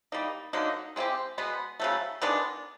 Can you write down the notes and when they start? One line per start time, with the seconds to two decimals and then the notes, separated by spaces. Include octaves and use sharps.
0.12 G3 A#3 D#4
0.53 D3 F#3 A#3 D#4
0.96 G#3 C4 E4 G4
1.38 B2 G#3 B3
1.80 C#3 F#3 A3
2.22 D#3 G#3 B3 D4